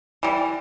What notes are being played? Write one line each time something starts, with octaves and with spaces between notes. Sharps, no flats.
E3 G3